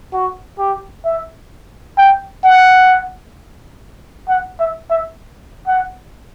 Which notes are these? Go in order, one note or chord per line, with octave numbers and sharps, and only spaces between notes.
F#4
G4
E5
G5
F#5
F#5
E5
E5
F#5